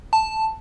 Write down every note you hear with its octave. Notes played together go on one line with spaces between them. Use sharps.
A5